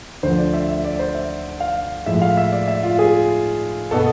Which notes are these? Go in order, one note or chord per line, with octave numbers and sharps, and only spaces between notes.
D2 D3 F3 C5
D5
E5
E5
D5
C5
E5
F5
A2 F3 G#3 E5
F5
E5
D5
E5
F4
G#4
B2 B3 A4